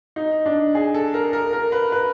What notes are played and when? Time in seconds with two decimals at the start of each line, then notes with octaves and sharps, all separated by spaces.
0.16 D#4
0.46 D4
0.75 G#4
0.94 A4
1.14 A#4
1.33 A#4
1.53 A#4
1.72 B4
1.92 B4